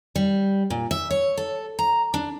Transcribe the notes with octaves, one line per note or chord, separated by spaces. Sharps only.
G3
A#2
E5
C#5
A4
A#5
D4